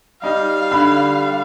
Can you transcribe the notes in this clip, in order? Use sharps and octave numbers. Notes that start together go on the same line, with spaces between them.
G3 D#4 F5
D3 B5